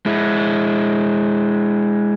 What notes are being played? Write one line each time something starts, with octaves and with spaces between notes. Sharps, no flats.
G#3 E4